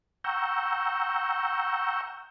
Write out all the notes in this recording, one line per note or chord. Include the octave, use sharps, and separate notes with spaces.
F#5 G5 A#5 C#6 E6 G6